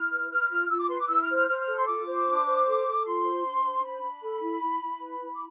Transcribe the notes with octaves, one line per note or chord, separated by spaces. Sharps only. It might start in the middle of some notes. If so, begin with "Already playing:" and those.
Already playing: E4 F6
B4
B4 F6
F4 F6
F4 E6
D6
B4 C6
D6
E4 E6
F6
C5
F6
C5 F6
F6
A4
C6
F4 D6
C5
D4
C5
A4
A4
F4 C6
C5
D4
C5
D4 B5
D4
A4
E4
E4
E4
B4
E4
D6